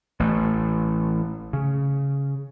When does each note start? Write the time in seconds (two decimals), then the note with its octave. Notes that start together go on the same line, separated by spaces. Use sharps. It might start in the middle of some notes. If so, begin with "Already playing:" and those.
0.20 A1 A3
1.53 C#3